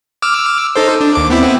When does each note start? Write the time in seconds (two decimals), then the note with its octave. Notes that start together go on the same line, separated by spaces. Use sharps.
0.22 D6 E6 F6
0.76 D#4 A4 C5
1.01 D4
1.15 D#2 D6
1.30 B3 C4 E4